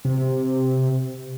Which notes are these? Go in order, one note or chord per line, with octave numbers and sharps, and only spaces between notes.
C3